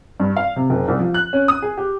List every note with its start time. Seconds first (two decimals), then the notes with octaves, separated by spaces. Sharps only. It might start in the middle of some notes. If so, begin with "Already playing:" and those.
0.20 G2
0.37 F5
0.56 C3
0.70 F#1
0.88 C2
0.99 F3
1.14 F#6
1.33 C#4
1.48 D#6
1.62 G#4
1.77 G4